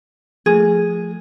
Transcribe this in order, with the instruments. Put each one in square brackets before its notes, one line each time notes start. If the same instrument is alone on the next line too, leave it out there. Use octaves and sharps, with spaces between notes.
[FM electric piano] F3 A3 [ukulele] G#4